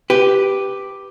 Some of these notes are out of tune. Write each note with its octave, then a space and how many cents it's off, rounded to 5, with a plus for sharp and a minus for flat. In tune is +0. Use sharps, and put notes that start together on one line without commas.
G4 +0 B4 +0